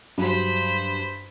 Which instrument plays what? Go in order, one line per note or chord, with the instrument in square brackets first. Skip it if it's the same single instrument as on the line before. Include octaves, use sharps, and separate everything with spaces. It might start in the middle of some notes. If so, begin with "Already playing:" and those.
[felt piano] G2 F#3 [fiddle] C5 B5